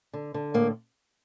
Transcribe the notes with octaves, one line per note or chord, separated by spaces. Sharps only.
D3
D3
A2 A#3